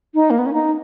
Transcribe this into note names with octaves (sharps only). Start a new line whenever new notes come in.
D#4
A#3
B3
C#4
D#4